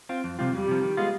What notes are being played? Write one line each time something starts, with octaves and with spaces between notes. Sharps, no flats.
C4 F4
F2
C3 G3 C4 F4
F2 G3
C3 F3
D#3
G#3 B3 F4